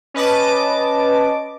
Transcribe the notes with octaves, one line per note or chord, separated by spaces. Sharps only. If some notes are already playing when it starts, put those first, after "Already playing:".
C#4 B4 D#5 A5 D6